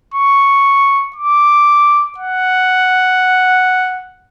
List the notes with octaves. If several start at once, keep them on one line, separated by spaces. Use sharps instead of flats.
C#6
D6
F#5